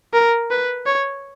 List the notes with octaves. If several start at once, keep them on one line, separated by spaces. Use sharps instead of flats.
A#4
B4
C#5